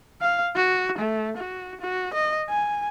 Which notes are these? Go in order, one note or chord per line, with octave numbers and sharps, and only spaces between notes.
F5
F#4
A3
F#4
F#4
D#5
G#5